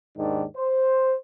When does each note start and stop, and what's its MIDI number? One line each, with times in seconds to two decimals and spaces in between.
0.17 0.45 39
0.17 0.45 44
0.17 0.45 51
0.17 0.45 62
0.57 1.14 72